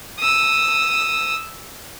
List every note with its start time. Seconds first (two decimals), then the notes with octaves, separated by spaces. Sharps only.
0.19 D#6 E6